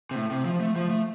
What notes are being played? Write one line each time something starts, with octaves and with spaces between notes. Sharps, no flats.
C3
A2
C3
F3
A3
F3
A3